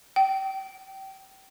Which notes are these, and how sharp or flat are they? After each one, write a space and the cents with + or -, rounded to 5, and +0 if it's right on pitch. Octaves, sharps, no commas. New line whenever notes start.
G5 -25